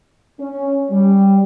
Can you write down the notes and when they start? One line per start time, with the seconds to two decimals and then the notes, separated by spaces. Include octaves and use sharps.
0.40 C#4
0.91 G3